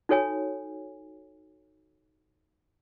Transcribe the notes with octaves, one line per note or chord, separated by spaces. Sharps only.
D#4 F#4 A4 C#5 G#5